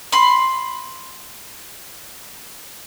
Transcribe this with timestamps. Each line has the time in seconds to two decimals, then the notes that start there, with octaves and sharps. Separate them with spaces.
0.12 B5 C6